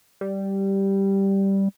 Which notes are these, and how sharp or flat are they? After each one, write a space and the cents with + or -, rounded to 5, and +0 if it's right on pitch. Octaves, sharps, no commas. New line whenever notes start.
G3 -5